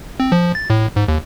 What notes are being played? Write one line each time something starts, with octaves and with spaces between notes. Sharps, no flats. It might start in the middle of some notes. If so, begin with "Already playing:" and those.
C4
F3
A6
A2
G#2
D#2